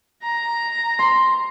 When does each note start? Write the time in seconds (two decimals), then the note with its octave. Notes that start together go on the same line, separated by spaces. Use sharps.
0.23 A#5
0.99 C6